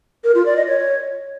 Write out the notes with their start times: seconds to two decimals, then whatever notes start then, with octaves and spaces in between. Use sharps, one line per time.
0.24 A#4
0.35 F4
0.46 D5
0.56 D#5
0.67 C#5